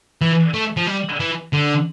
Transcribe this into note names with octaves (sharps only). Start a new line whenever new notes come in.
E3
A3
F3
G3
E3
D3